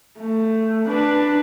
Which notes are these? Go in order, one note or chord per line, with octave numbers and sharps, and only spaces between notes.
A3
D4 B4